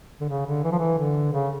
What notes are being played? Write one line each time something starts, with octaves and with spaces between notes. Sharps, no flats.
D3
C#3
D3
E3
F3
E3
D3
C#3